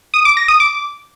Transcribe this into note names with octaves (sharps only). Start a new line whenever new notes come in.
D#6
D6
A#6
D#6
D6